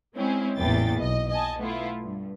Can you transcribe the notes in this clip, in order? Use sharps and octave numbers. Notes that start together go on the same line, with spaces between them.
G#3 C4 C#4 E4
A1 E2 A#2 E3 G5 A6
B1 D#5
D#5 G#5 A5
A3 B3 E4 F4
G2